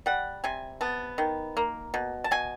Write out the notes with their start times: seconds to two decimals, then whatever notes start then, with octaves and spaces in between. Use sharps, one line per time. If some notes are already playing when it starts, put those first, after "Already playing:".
0.06 G3 F#5
0.44 C3 G#5
0.81 B3 A5
1.18 D#3
1.57 A#3
1.94 B2
2.24 A5
2.31 B2 G#5